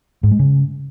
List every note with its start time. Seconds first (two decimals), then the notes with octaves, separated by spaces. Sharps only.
0.23 G#2
0.31 G#3
0.39 C#3